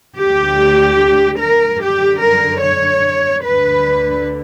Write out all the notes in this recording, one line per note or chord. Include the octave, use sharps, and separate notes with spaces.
D2 D3 G4
A#4
F#2 D3 G4
A#4
C#5
D2 D3 B4